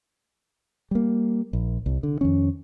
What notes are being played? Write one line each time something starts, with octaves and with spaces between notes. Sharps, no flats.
G3 A#3
A#1
C2
D3
F2 D#3 C#4